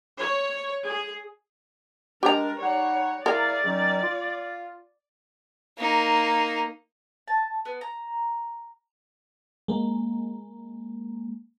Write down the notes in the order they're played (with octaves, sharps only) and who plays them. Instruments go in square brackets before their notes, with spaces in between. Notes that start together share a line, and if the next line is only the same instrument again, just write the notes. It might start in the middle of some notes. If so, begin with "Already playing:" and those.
[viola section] C#5
G#4
[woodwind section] G#3 D4 [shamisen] G4 A#5 [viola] A#4
[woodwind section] G3 D#4 F#5 [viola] C#5
[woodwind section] E4 G#4 F5 [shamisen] A#4 [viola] D5
[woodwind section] D#3 F#3 C#4
F4
[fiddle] A#3 D#4
[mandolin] A5
B3
A#5
[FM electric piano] G#3 A#3